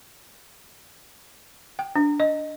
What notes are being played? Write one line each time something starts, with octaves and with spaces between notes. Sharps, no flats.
G5
D4
D#5